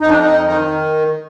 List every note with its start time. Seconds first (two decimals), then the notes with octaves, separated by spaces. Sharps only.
0.01 F2 D#4
0.09 D4
0.19 D#4
0.47 D#3 D#4